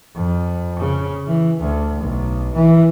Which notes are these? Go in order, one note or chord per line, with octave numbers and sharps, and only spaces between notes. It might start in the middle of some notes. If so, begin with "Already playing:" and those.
F2
C#3
E3
D2
B1
E3